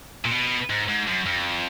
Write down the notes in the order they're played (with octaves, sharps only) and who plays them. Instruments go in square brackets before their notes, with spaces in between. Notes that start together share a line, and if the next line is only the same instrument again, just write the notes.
[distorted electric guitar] A#2
B2
G#2
G#2
F#2
F2